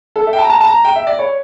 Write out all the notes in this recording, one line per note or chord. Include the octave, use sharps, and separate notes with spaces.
A4
E5
G5
A5
A#5
A5
A5
A#5
G5
E5
D5
C#5